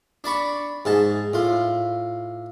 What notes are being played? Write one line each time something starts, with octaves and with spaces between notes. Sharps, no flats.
D4 D5 B5 C#6
G#2 G#3 A5
A2 F4